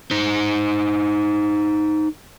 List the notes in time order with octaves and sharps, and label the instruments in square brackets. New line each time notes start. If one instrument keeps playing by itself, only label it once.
[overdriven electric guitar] D#4 C5